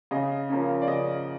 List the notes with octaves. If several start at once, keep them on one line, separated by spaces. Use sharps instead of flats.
C#3 D#5
F3 A#3 C#4
D5
C#3 D#5